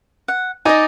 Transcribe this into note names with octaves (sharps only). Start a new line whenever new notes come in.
F#5
D#4 D5 D#5 G#5